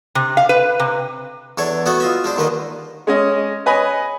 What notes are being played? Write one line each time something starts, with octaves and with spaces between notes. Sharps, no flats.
C3
F5
B4
C3
E2 D4 A4 C#5
A3 B3 F#4 A4 F#5
F4 D#5 E5
G#3 D4 C5
D#2 D3 D#3 B4 D#5
G#3 C#4 D#5
B4 C#5 D#5 G#5 B5